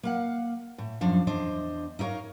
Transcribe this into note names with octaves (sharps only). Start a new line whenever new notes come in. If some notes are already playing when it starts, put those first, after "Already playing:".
A#3 F5 F#5
A2
F#2 F3 D4 F5
E2 D4 C5 D#5
D#4 E4 A#4 C#5 F5